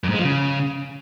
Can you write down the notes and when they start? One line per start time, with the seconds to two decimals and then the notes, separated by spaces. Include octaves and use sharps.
0.04 F2
0.09 G#2
0.14 G#3
0.19 F3
0.24 C#3